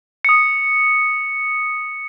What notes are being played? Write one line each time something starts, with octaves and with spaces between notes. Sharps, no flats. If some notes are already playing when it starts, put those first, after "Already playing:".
D#6 C#7